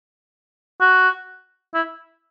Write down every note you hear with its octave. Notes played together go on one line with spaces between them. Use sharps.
F#4
E4